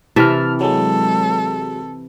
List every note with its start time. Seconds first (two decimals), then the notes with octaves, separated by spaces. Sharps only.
0.16 C3 E3 E5 A5 F6
0.61 F#3 G#3 A4